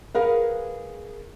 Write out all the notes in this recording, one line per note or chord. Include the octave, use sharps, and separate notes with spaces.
G#4 A#4 B4 F5 F#5